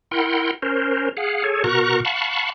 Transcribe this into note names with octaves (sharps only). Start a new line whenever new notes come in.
E4 A#4 F#5 G5 C6
C#4 A#4 C5
G#4 F5 F#5
G#4 A4 C#5
B2 F#4 A#4 A#5 C#6 F#6
F5 F#5 A5 B5 C#6